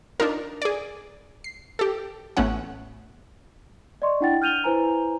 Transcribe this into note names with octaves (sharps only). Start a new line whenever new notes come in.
D4 D#4 F4 A#4
G#4 D5
C7
G4 A4
A1 A3 B3 C#4 F#5
D5 D#5 C6 C#6
D4 E4 F#5 G5 A6
F6 G6 D#7 F7 G7
E4 B4 C5 G#5 A#5